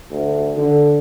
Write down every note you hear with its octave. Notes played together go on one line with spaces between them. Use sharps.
D2
D3